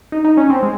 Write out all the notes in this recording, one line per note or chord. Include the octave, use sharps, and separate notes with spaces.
D#4
D#4
C#4
C4
G#3